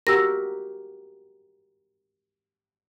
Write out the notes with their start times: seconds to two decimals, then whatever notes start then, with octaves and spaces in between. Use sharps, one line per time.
0.07 F#4 G4 A#4 E6 A#6